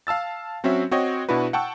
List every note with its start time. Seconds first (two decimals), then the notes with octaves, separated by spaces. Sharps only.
0.07 F5 A5 E6 A6
0.64 F#3 C4 C#4 F#4 E5
0.91 C4 F#4 C#5 D#5 G5
1.29 B2 D4 E4 F#4 B4
1.53 F#5 G5 A5 C#6 E6